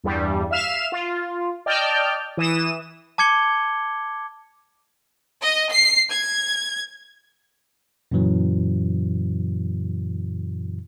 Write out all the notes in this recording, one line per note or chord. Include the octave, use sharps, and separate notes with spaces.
E2 G2 G3
E5 F5 F6 E7
F4
D5 D#5 G5 A5 F6 G6
E3 D#6 E7
A5 D6 G#6 C#7 G7
D#5
C7
G#6
F#2 A#2 C#3 E3 F#3